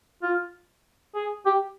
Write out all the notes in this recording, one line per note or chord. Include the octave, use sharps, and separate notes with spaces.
F4
G#4
G4